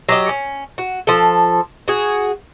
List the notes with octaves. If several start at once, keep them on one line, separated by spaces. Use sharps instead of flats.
F#3 G4 D#5
C#4
F#4
F3 A4
F#4 G#4